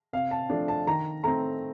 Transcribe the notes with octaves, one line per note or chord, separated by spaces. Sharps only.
C3 F5
A5
F3 A3 D4
A5
D#3 A#5
A3 C4 A#5